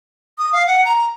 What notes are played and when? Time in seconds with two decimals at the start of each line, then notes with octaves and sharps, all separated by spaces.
0.39 D#6
0.53 F5
0.67 F#5
0.85 A#5